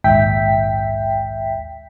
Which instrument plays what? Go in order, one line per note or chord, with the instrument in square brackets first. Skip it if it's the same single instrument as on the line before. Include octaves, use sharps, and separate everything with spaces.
[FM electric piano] A#1 D#2 G#2 E5 G5 B6